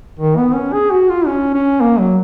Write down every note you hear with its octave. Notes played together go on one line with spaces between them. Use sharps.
D#3
B3
C#4
G#4
F#4
F4
C#4
C#4
A#3
F#3